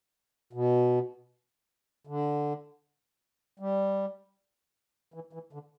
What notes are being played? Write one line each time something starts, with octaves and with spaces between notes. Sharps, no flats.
B2
D3
G3
E3
E3
D3